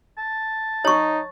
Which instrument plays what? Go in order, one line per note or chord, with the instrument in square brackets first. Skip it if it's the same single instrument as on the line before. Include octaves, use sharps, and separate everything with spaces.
[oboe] A5
[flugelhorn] D#4 [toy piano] C#5 C#6